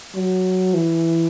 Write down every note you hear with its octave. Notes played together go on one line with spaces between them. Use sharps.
F#3
E3